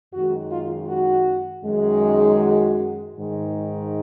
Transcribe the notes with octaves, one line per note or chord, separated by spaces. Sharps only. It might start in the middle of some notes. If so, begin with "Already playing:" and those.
F#2 D#3 G#3 F#4
F4
F#4
F#2 D#3 G#3
F#4
G#2 D#3 G#3